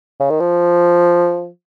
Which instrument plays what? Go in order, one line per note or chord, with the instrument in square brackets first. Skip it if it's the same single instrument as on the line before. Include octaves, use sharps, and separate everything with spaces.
[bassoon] C#3
D#3
F3